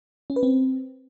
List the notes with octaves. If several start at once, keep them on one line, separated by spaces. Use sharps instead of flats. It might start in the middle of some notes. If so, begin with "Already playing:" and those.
C#4
B4
C4